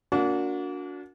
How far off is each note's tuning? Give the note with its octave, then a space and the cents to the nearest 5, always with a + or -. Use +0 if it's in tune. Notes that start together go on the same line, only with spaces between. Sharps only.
A#3 -5 D4 -35 F#4 -30